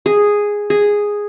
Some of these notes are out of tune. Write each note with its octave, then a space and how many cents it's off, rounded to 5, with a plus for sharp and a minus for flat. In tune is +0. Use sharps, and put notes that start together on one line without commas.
G#4 -5
G#4 -5